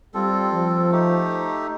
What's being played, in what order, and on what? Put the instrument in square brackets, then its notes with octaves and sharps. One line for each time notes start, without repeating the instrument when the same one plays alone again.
[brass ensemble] G3 [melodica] C4 F4 A4
[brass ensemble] F3
[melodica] A3 D#4 G4